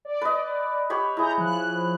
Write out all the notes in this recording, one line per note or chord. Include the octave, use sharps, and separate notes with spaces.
D5
B4 D#5
G4 C#5 B5
E4 G#4 A#5 G6
F3 F#6